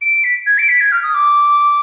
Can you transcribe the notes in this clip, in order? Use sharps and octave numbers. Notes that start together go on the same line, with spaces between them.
D7
B6
G#6
D7
B6
G#6
F6
D#6
D6